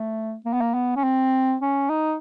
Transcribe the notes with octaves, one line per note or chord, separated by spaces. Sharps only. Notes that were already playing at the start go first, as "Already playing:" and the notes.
Already playing: A3
A#3
B3
A#3
B3
C#4
C4
C#4
D#4